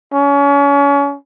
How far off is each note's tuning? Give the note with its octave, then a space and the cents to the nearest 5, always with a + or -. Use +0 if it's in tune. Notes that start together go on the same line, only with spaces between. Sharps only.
C#4 +30